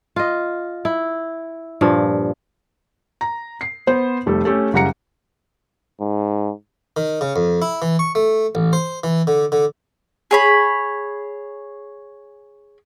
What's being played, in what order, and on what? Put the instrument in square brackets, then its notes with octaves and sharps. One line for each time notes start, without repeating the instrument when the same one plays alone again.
[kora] F4 D#5
E4
G2 A#2 F3
[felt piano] A#5
C7
B3 C5
F1 G3 A3 A4
A3 C#4 G4 A4
F#1 C#3 G3 F#5 A#5 C#7
[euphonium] G#2
[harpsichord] D#3
C#3
F2
E4
E3
C#6
A3
A1
C5
E3
D3
D3
[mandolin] G#4 C#5 B5